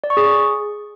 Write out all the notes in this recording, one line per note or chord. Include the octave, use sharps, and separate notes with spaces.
D5
C#6
G#4